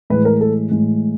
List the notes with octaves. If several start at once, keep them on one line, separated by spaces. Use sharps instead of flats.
A2 E3 G#3 B4
A#4
A4
A2 E3 G#3